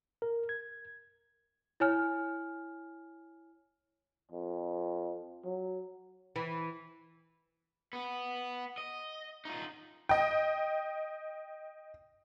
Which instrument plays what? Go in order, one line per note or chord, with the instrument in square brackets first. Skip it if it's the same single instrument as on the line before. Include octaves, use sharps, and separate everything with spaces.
[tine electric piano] A#4
G#6
[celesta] E4 C#5 G#5 F6
[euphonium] F2
F#3
[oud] E3
[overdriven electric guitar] B3
D#5
D#4 F4
[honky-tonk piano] D#5 G5